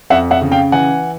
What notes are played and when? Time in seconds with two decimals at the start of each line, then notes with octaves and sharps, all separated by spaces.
0.10 F2 E5 F#5
0.31 E5 F#5
0.42 C#3
0.52 F5 G5
0.72 E3 F#5 G#5